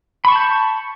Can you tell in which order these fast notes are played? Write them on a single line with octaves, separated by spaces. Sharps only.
B5 C#6 A5 G6